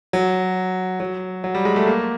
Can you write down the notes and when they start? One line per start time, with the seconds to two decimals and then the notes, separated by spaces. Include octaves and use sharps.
0.13 F#3
1.00 F#3
1.44 F#3
1.55 G3
1.65 G#3
1.76 A3
1.87 A#3